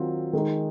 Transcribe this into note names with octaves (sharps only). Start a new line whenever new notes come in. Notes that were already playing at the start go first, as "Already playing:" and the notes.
Already playing: D#3 F#3 C4 F4
D#3 G#3 D#4